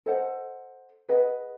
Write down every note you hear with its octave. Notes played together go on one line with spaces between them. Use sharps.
A4 C5 D#5 F#5
G#4 B4 D#5 F#5